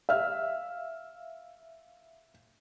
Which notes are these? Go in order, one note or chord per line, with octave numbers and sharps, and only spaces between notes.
E5 F5 F6